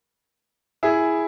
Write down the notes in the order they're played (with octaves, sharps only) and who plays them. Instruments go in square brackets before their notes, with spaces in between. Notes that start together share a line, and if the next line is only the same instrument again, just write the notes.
[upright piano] E4 G#4